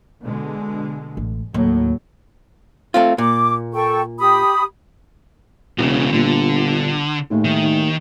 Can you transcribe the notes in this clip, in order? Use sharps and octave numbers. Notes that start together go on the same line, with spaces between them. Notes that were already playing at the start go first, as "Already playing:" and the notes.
B2 D3 G#3
A1
D#2 A2 F#3
A3 C4 F4
A#2 D6
A4 G5 C#6
G4 B5 D#6
E1 B1 C#3 F#4
G1 A#2 D3
D#2 A2 G#3 A3
D#3
D#2